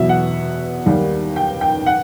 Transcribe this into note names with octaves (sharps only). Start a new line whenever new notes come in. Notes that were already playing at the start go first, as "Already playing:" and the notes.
Already playing: E2 B2 F#3 E5
F#5
D#2 D#3 G3
G5
G5
F#5